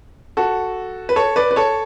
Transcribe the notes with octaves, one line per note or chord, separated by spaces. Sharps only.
F#4 A4
B4
A4 C#5
B4 D5
B4
A4 C#5